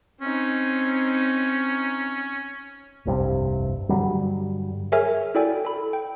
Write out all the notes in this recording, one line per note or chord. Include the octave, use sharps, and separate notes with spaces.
C4 C#4 D#4
F1 C2 G2 C3
G2 D3 F#3 G3
G#4 A#4 C#5 E5 G#5 F6
E4 F#4 A4 D5 G5 G#5
A4 B5
G5